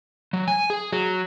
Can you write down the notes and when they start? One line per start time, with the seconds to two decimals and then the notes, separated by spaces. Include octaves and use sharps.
0.33 F#3
0.48 G#5
0.70 G#4
0.92 F#3